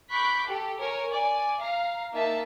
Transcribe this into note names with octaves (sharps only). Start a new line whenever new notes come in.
B5 C#6 D6 F#6 G6 B6
G4 A4
A#4 C#5 G#5
D5 G#5
F5 A#5
A#3 D#4 E5 A5